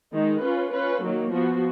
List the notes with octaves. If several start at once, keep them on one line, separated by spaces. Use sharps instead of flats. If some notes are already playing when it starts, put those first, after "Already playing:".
D#3 G#3 D#4
C#4 F4 B4
C#4 F4 B4
D#3 F#3 A#3
F3 B3 F#4